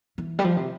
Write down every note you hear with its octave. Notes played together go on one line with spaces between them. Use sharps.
E3
G3
F3
C3